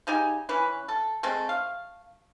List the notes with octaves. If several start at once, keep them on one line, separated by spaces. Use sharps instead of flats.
C#3 D#4 G4 G#5
E3 C#4 B4
A4
G#3 A3 C4
F5